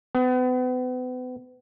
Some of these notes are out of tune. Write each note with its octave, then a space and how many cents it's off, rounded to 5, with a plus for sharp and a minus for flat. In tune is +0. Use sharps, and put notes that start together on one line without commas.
B3 +40